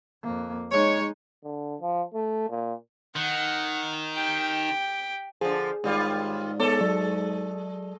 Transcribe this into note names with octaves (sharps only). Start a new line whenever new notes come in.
F2 A#3
G#3 D#4 C#5
D3
F3
A3
A#2
D#3 F#5
G4 G5
D3 F3 G#4
D#2 G#2 G3 F4
G#3 B3 A4 C#5 D6
F#3 D5